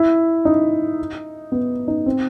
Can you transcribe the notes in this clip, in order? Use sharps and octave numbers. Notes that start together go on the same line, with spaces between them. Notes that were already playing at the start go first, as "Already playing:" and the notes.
Already playing: E4
D#4
B3
D#4
C4